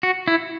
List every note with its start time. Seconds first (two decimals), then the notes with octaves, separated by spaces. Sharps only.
0.03 F#4
0.28 E4